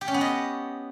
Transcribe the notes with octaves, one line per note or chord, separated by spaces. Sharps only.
G4
C#4
B3
D#5